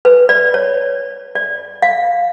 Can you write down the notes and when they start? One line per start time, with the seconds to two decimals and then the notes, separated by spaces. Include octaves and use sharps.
0.05 B4
0.29 D5
0.54 C#5
1.35 D5
1.82 F5